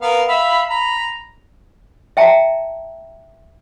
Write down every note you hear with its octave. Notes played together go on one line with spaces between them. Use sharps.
B3 A#4 F5
E5 F5 B5
A#5 B5
E5 G5 A5 A#5